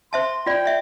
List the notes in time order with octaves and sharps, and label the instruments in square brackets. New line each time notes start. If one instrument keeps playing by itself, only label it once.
[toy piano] C5 E5 A5 [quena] C6
[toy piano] F4 D5 [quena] G5
[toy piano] D5 E5